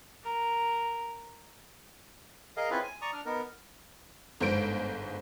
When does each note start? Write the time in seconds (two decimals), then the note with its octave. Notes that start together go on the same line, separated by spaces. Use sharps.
0.24 A#4
2.57 G#4 A#4 D#5 F5
2.71 C4 C#4 E4 F4 G#4 B4
2.83 G#5
3.02 D5 A#5 C#6 D#6
3.13 D4 F6
3.26 B3 D#4 A#4
4.40 G1 G#2 C5 D7